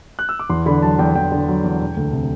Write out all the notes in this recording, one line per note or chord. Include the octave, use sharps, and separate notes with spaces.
F#6
E6
D6
E2 C6
D3 B5
F#3 A5
E2 G5
E2 G5
D3
F#3
E2
E1
D2
C3